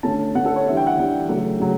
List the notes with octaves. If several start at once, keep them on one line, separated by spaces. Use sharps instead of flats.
D3 A3 C#4 A5
D3 A3 C#4 F#5
A4
C#5
E3 G3 D4 E5
G5
F#5
E3 G3 D4
C#3 F#3 A3
C#3 F#3